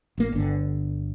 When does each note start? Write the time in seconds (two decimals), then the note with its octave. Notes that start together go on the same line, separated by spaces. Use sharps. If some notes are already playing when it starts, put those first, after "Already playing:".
0.18 A1 A#3
0.32 G1 D3